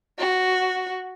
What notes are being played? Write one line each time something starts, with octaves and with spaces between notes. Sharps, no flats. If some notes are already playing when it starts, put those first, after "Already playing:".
F#4